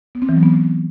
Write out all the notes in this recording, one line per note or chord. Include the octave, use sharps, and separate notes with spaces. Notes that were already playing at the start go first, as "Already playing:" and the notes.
B3
C4
E3
F#3
B3